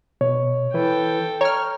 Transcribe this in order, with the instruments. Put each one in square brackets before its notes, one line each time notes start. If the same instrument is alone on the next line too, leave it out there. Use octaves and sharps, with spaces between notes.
[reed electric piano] B2 [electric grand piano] C#5
[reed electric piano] E3 E4 B4 [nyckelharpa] A4 G5
[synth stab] C#5 F6 [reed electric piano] A#5